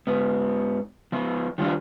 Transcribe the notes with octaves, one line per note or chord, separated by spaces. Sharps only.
G#2 B3
F3 B3
D#3 F3 G3 D4 F4